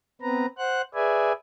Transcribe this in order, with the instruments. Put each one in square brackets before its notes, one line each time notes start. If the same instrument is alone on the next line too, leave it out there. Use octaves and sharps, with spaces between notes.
[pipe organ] B3 C4 B4 A#5
C5 F#5 F#6
G#4 B4 D5 E5 G#5